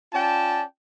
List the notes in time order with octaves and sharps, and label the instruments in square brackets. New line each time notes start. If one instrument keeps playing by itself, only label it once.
[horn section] C#4 F4 D5 G5 A5